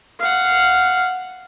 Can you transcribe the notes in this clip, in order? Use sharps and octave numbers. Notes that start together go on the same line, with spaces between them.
F5 F#5